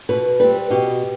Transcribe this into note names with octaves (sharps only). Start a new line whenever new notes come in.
B2 B4
G3 C4 B4
B2 G4